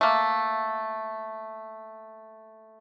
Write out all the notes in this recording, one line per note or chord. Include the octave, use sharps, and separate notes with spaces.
A3 A#3